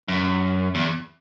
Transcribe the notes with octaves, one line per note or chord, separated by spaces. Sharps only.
F#2
E2